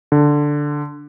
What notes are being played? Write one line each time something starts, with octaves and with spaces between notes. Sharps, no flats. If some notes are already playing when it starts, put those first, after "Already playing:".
D3